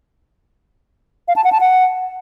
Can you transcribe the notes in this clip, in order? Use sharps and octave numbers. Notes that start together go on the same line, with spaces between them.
F5
A5
F#5
A5
F#5